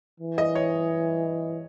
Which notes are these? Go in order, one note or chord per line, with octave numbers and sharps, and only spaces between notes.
E3
D#5
C#5